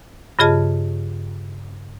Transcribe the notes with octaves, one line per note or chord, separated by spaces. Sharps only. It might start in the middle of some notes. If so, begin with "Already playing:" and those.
G2 C#3 F4 G#4 D#5 A5